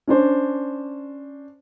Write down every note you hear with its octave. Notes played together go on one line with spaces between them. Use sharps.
C#4 D4 C5